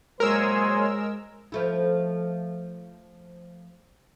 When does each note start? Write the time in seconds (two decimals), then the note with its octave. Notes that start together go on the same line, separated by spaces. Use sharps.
0.20 A#2 F#3 G#3 G#4 A#4 C5 C#5 E6
1.52 F3 A3 E4